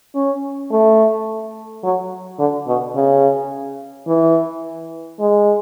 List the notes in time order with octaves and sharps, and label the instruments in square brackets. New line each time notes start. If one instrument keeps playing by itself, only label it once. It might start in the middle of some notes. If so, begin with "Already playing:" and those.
[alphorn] C#4
A3
F#3
D3
B2
C#3
E3
G#3